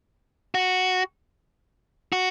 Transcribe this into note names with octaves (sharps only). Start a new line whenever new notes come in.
F#4
F#4